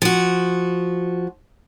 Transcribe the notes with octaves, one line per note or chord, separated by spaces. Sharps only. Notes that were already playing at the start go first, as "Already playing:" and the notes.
F3 F#4